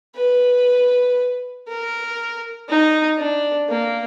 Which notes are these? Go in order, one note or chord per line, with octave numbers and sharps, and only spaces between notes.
B4
A#4
D#4
D4
A#3